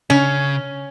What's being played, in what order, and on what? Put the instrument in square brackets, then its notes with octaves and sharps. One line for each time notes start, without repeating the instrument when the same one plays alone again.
[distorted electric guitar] C#3 [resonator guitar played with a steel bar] C#4